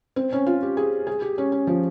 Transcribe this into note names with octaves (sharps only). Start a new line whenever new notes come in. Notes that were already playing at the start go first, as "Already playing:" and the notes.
C4
C#4
F4
G4
G#4
G#4
G4
C#4
C#4
F3